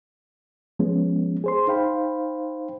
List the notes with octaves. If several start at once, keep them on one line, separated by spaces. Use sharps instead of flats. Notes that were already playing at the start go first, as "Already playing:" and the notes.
F3 G#3 B3 C#4
G#4 C5 C6
D#4 C5 F5 G5 B5